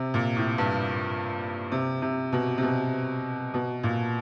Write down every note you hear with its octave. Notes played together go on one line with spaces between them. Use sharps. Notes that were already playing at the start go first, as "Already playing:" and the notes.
Already playing: C3
A#2
A2
G2
C3
C3
B2
C3
B2
B2
A#2